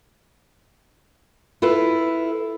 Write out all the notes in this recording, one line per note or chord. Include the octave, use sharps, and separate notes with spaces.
E4 F4 A4 B4